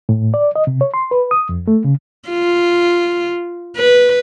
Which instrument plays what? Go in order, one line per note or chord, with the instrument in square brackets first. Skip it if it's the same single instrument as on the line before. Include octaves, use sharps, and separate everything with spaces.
[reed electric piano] A2
D5
D#5
C3
C#5
C6
B4
D#6
F2
A3
C#3
[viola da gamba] F4
B4